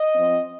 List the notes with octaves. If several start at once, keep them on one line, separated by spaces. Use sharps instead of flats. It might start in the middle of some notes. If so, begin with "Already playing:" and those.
Already playing: D#5
F3 C4